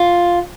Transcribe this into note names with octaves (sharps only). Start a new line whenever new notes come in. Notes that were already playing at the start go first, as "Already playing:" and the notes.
Already playing: F4